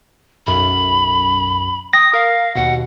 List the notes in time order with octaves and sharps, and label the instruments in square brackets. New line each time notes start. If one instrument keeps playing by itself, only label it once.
[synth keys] B1 F#2 [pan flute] B5
[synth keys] G5 [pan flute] D#6 [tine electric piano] A#6
[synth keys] A#4 [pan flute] F5
[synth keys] D#2 B2 [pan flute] F#5